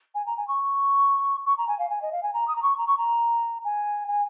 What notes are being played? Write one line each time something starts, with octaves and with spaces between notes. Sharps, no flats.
G#5
A#5
G#5
C#6
C#6
A#5
G#5
F5
G#5
D#5
F5
G#5
A#5
D#6
A#5
C#6
A#5
C#6
A#5
G#5
G#5